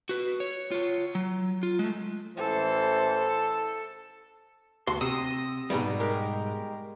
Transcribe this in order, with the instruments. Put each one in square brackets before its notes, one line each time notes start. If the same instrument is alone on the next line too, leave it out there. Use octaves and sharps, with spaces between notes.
[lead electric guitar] F#4 B4
C#5
F4 C#5
F#3
F4
G#3 A3
[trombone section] A1 E3 C5 [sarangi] A4
[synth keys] D2 F#4 A4 [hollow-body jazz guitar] C6
[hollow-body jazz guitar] C3 [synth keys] D#6 E6 A#6
[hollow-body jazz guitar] G#2 B2 G3
[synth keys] G#3 G4 A#4